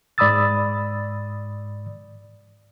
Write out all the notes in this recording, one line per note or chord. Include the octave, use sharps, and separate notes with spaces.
G#2 D5 B5 D#6 E6 A6